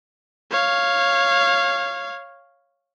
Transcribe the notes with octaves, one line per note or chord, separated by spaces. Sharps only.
C#5 F5